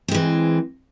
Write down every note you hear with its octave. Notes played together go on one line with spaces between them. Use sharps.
E3 G#3 C4